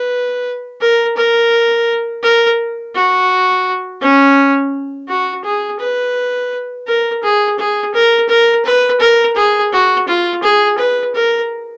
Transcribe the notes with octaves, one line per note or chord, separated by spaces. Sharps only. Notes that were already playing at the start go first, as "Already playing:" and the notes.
Already playing: B4
A#4
A#4
A#4
F#4
C#4
F#4
G#4
B4
A#4
G#4
G#4
A#4
A#4
B4
A#4
G#4
F#4
F4
G#4
B4
A#4